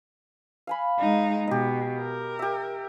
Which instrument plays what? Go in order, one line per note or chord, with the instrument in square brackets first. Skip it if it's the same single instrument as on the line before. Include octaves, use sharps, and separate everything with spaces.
[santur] F5 G#5 B5
[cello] G#3 D#4
[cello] B2 [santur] G4 D#5
[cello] A#4
[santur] G4 E5